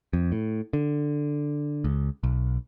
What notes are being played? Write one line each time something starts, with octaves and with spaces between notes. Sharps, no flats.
F2
A2
D3
C#2
B1